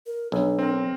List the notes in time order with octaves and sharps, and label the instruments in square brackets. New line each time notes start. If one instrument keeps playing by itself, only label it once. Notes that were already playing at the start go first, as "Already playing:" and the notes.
[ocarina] A#4
[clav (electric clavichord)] B1 [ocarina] D4
[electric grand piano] C4 A#4